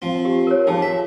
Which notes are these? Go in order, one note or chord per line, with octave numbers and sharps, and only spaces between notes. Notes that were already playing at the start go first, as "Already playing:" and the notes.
F3 C4
G4
A#4 C#5
F3 D#4 G#4 A5
E5